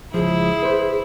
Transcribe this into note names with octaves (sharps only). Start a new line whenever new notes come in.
C#2 F3 E4 G#4
B4 C5